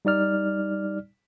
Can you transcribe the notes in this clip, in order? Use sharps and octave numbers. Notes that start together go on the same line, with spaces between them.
G3 D#4 D5 F6